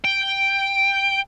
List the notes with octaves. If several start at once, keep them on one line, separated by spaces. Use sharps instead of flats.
G5